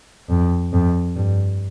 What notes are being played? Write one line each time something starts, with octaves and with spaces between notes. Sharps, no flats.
F2
F2
G2